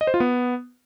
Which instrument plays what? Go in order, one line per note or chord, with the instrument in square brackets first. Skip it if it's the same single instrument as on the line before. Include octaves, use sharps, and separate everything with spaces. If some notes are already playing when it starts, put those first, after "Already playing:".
[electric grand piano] D#5
C5
F4
B3